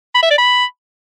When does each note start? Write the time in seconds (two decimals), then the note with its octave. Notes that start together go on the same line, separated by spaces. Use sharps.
0.15 B5
0.23 E5
0.30 D5
0.38 B5